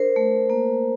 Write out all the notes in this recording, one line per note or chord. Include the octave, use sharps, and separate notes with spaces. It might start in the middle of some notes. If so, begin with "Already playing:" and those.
Already playing: D4 A#4 C5
A3
A#3